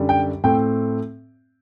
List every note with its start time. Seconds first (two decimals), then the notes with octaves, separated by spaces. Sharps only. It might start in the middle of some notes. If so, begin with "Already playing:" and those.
Already playing: F#2 D3 G3
0.09 G5
0.44 A2 A3 C4 G5